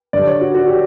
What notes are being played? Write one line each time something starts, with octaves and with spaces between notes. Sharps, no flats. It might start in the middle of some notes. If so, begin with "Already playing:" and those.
G2 D3 G3 D5
C#5
F#4
F#4
G4